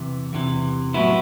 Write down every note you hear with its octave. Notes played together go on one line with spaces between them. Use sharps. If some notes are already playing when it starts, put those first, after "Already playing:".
Already playing: E2 C3 E3
E2 C3 E3
A2 F#3 B3 E4